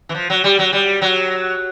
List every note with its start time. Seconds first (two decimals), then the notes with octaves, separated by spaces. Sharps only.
0.09 E3
0.15 F3
0.30 F#3
0.44 G3
0.59 F#3
0.73 G3
1.02 F#3